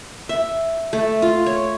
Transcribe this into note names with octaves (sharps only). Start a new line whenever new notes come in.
E5
A3
F4
C#5